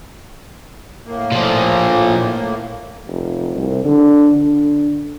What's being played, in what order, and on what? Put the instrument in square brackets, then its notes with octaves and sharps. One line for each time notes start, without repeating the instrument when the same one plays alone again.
[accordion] A2 A#3
[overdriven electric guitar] A#2 F3
[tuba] F1
C2
D3
D3